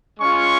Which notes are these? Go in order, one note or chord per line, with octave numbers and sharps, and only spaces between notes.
G#3 C#4 F4 G#5 C#6